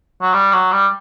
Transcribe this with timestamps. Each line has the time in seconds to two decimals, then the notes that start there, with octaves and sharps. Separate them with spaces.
0.22 F#3
0.33 G3
0.53 F#3
0.72 G3